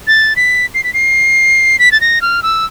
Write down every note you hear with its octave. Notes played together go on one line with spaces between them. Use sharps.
A6
B6
C7
B6
C7
B6
A6
A#6
F6
E6